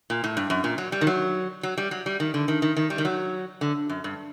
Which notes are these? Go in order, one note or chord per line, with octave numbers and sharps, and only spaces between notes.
A#2
A2
G2
F#2
A#2
F#3
G3
D#3
F#3
F#3
G3
F#3
G3
D#3
D3
D#3
D#3
D#3
G3
D#3
F#3
D3
F#2
G2